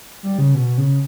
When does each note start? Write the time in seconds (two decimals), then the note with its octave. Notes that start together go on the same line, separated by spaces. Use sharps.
0.23 G3
0.38 C#3
0.54 B2
0.78 C#3